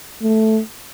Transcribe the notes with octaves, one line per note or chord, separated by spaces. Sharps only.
A3